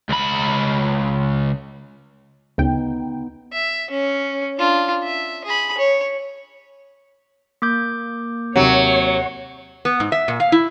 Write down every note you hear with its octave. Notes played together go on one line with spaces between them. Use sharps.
C#2 B5
D2 C#3 B3 D#4 G5
E5
C#4
D4 F4
E5
G#4 B5
C#5
A#3 D6 G6
D#2 C3 F#3 C#5
B3
G#2
E5
A#2
F5
E4